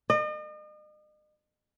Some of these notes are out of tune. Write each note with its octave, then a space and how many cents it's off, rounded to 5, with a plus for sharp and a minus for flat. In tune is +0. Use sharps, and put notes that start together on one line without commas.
D#5 -40